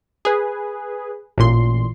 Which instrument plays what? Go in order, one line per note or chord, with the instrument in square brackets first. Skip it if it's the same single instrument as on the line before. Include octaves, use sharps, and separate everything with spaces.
[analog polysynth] G#4 B4
A1 A#2 C6